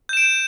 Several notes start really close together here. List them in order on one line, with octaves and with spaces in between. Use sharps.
G6 E7 D7